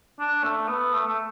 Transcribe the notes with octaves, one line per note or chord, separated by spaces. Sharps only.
D4
A3
B3
A3
A3